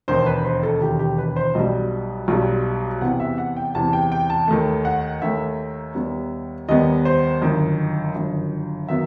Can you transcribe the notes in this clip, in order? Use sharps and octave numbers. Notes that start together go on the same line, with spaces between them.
E1 D#2 D#3 C5
B4
C5
A4
E1 D#2 D#3 G4
G4
B4
C5
B1 B2 G3 D#5
B1 B2 G3
E2 C3 E3 B3 F#5
E5
F#5
G5
E2 C3 E3 B3 A5
G5
G5
A5
D#2 D#3 A3
F#5
D#2 D#3 A3 E5
D#2 D#3 G3 B3
D#2 D#3 G3 B3 D#5
C5
G1 F#2 D#3
G1 F#2 D#3
D#3 F#3 B3 E5